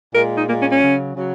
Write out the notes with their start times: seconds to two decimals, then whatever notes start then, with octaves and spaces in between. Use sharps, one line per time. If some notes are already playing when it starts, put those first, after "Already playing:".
0.14 A#2 G#3 A#4
0.37 D#4
0.47 A#2 A#3
0.50 G#3
0.59 C#4
0.70 C#4
0.80 C#3 F#3
1.15 C#3 F#3